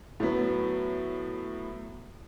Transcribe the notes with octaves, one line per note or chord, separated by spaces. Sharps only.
A2 F#3 B3